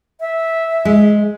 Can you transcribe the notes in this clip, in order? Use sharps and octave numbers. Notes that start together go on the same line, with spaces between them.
E5
G#3